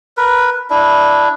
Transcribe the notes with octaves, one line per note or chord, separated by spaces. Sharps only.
A#4 B4
D4 E4